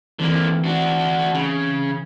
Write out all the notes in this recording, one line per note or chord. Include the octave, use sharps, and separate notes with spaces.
D3 E3 A#3 C4
D4 F#4
C#3